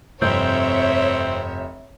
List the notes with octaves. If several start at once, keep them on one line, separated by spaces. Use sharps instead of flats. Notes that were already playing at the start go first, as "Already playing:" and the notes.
F1 G2 C4 C#5 E5 G6